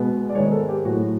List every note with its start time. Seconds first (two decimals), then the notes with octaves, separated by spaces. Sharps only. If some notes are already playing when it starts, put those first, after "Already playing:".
Already playing: B2 G#3 B3
0.29 D5
0.35 G#2 D#3 G#3 C#5
0.52 A4
0.69 G4
0.85 A2 F#3 A3 F#4